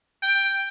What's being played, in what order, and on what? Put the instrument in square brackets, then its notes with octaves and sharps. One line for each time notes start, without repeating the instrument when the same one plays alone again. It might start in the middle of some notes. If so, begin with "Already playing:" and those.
[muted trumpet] G5